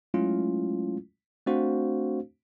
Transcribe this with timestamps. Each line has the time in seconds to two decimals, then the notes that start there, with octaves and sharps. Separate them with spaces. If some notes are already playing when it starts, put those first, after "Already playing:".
0.14 F#3 G#3 A3 C#4 E4 F4
1.47 A3 C4 D4 F#4 C5 F5